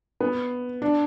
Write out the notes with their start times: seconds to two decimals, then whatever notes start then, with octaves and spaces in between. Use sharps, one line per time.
0.20 B3
0.82 D4